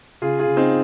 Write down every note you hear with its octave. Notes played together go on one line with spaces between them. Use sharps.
C#3 F4 G#4
F4 G#4
C#3
C4 D#4